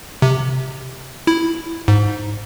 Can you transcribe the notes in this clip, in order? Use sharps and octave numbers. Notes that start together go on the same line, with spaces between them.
C3
E4
G#2